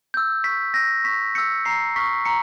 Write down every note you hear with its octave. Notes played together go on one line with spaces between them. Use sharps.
E6 G6
C#6 B6
E6 G6 A#6
C#6 B6
E6 G6 C#7
A#5 C7
C#6 F6 B6
A#5 C#7